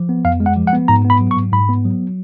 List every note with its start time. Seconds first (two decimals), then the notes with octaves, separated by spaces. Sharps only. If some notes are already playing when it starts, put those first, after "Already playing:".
Already playing: F3
0.09 B3
0.25 F2 F5
0.40 G#3
0.46 F#5
0.57 F3
0.67 F#5
0.73 B3
0.88 G#2 A#5
1.05 B3
1.10 B5
1.21 F#3
1.31 C#6
1.37 G#2
1.52 G#2 B5
1.69 B3
1.85 F#3